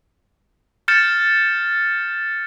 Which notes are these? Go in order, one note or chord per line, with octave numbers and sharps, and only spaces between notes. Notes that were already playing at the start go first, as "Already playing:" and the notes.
F6 G6 A6 C#7 E7